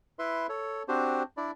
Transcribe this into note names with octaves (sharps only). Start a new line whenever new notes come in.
E4 B4 E5 C6
A4 C#5
C4 D4 F#4 G4 C5
D4 E4 D5